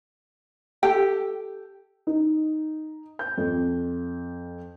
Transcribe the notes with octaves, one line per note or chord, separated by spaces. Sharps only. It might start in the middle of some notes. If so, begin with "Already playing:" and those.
G4 A4 G5
D#4
G6
F2